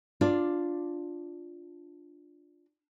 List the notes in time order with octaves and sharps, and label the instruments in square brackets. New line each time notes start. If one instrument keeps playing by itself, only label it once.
[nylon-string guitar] D4 F4 D5